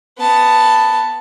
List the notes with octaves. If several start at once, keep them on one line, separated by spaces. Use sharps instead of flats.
B3 A5